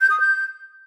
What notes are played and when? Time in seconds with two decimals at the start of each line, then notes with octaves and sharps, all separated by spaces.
0.01 G6
0.10 D#6
0.20 G6